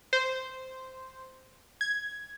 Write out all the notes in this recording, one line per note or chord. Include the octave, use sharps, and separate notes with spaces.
C5
G#6